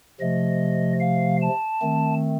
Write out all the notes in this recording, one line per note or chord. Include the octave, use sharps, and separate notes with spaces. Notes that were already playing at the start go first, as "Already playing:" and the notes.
C3 F3 A3 D#5
F5
A5
D#3 A3 C4